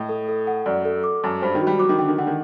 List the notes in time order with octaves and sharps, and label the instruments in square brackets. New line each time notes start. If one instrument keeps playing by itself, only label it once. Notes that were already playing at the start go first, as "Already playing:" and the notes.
Already playing: [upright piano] A2 [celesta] D#5
[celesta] A4
A4
F#5
[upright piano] F#2 [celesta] D5
[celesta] A4
D6
[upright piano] F#2 [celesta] A5
[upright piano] G2 [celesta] C5
[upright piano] D#3
[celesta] F#4
[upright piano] G3
[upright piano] F#3 [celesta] D6
[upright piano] D#3
[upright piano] D3 [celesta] G5
[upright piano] D#3
[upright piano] D3 [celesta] F#5
[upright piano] D#3